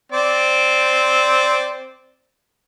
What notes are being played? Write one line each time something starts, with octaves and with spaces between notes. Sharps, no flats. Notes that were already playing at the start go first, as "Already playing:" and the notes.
C4 C5 D5